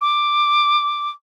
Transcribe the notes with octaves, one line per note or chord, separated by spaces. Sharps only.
D6